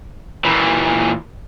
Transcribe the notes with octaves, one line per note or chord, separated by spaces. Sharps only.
A#2 E3